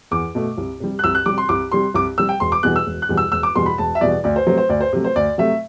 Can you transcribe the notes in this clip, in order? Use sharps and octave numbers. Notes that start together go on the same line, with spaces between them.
E2 D6
B2 A3
C2
C3 G3
F#6
C2 E6
F#6
C3 G3 D6
C6
C2 D6
C3 G3 C6
C2 D6
C3 G3 E6
G5
E1 C6
D6
E2 B2 G3 F#6
E6
E1
F#6
E2 B2 G3
E6
E1 E6
D6
E2 B2 G3 C6
B5
E1 A5
E5
E2 B2 G3 D5
D2 D5
C5
C3 F#3 A3 C5
C5
D2 D5
C5
C3 F#3 A3
C5
D2 D5
C3 F#3 A3 E5